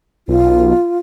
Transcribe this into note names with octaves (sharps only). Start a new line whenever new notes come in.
B1 F4